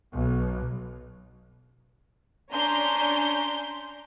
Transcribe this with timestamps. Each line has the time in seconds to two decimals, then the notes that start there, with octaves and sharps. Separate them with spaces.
0.13 B1
2.52 C#4 D4 A#5 C6 G6